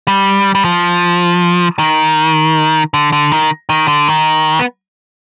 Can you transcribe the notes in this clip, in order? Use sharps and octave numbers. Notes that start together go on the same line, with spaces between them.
G3
G3
F3
D#3
D3
D3
D#3
D#3
D3
D#3
B3